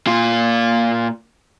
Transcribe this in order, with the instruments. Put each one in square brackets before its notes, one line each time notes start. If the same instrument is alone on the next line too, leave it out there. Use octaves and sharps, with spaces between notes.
[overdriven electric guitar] A#2 F4